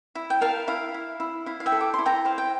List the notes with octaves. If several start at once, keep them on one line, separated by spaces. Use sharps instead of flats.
E4
G5
A#4 F5 A5
E4 F5
E4
E4
E4 F5
F5
E5 G5
A4
D6
E4 C6
G5 A#5
C5 F5
G5